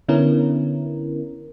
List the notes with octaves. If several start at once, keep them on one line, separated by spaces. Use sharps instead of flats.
D3 B3 C#4 E4 A#4